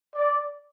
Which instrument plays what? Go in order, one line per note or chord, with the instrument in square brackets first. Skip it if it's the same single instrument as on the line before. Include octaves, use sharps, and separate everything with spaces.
[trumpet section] D5